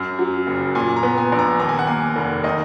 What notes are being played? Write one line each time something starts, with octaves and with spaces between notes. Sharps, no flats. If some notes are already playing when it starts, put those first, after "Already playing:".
Already playing: F#2
F#3
F#1
A#2 G#5
A#5
B3
G#5
A#1
A#5
D#2 A#5
G#5
F#5
A#3 G#5
F1
D#3 D#5